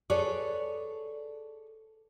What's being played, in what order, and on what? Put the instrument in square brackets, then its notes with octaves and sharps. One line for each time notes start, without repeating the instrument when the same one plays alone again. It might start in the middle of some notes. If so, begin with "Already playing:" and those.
[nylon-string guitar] G#4 A4 B4 C#5 D5